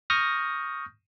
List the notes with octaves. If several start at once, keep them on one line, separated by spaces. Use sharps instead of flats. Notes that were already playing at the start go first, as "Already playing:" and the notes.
C#6 D#6 F6 G6 A#6